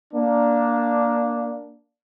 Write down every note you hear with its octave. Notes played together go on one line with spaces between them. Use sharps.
A#3 D4